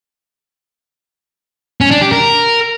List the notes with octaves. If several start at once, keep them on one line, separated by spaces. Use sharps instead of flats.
C#4
D4
G4
A#4